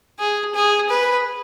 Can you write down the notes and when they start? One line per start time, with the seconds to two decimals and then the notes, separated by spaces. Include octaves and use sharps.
0.19 G#4
0.54 G#4
0.89 B4